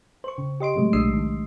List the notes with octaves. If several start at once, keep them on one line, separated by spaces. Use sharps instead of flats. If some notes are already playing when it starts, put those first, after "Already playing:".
C5 C#6
C#3
G4 D#5 C6 D7
A2 C3 F#3 G#3 A3
B1 G#3 D4 D#6 E6 C7
D#3